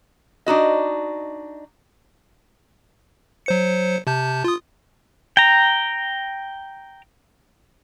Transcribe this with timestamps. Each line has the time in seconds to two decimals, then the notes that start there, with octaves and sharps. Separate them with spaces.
0.46 D4 D#4 F#4 D#5
3.46 F#3 C5 C#7
4.07 C3 A5 G6
4.44 F4 D#6
5.37 G5 A#5